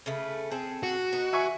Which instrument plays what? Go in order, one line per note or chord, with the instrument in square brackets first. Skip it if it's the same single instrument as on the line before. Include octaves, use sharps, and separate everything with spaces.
[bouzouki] C#3 A3 B4
C4 G#4 A4
[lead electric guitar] F#4
[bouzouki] B3 D#4
[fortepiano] E5 G#5 C#6